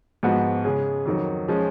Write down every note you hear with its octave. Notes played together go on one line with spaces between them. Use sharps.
G#2 F3 B3 F#4
C#3 G#3 C#4 G#4
F2 D#3 F#3
F3 G#3 C#4